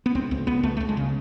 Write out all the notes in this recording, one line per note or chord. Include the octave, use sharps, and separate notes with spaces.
B3
C#2 C4
C#2
C#2 B3
C#2 A3
A3
C#2
G#3
C#3